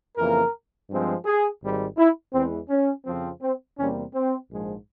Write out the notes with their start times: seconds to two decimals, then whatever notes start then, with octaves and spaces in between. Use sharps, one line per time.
0.17 F2 C#3 E3 A#3 A#4
0.89 G2 F3 G#3 C4
1.25 G#4
1.62 G#1 G#2 G3
1.97 E4
2.33 E2 E3 G#3 C4
2.69 C#4
3.05 F2 C#3 F3 C4
3.42 C4
3.77 E2 C3 G3 A#3 C#4
4.13 C4
4.49 A#1 G#2 F3 G#3